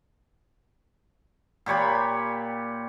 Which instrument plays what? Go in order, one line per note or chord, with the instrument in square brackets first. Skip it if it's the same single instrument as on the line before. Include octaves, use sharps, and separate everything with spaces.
[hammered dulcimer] A#2 G4 C#5 B5